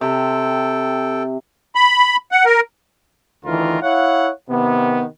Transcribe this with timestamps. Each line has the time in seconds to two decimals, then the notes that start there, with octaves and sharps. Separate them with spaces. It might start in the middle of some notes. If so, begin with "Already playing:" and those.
0.01 C3 A4 G5
1.75 B5
2.32 F#5
2.45 A#4
3.45 D2 D#3 E3 F4 A#4
3.82 E4 C#5 F5 F#5
4.50 C3 D#3 B3